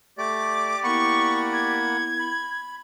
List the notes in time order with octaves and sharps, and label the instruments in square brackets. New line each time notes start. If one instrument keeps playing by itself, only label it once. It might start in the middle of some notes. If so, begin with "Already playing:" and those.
[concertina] A3 [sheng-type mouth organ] G4 D5 [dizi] D6
[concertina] A#3 F#5 B5 [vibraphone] B3 E4 [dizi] C#6
[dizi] G#6
[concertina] B5